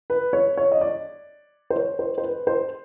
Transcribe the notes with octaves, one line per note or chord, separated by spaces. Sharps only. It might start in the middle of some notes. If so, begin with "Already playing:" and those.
B4
C#5
C#5
D#5
D5
C5
C#5
C5
C5
B4
C5